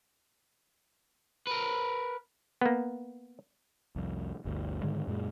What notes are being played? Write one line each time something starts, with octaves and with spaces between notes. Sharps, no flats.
A#4 B4
A#3 B3
C2 F2
G1 D2
G#2 D3 D#3 G#3
F#2 A#2 G#3